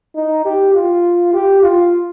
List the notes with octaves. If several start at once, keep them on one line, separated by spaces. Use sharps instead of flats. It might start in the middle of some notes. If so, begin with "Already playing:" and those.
D#4
G4
F4
G4
F4